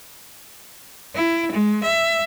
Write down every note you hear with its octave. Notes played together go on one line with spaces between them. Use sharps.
E4
G#3
E5